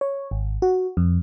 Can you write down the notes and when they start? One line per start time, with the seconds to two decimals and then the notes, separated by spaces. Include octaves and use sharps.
0.01 C#5
0.31 G#1
0.62 F#4
0.97 F2